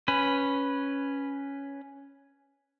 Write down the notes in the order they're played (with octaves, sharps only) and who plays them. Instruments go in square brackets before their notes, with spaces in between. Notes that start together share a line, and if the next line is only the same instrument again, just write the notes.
[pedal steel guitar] C#4 B4